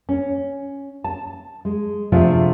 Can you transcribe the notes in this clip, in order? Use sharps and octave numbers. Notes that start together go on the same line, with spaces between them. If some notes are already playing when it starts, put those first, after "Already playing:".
C#4
A5
G#3
C3 F3 A3 D4 F4 G#4